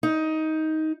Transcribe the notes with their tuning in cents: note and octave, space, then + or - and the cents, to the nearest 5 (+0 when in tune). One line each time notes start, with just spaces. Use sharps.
D#4 +15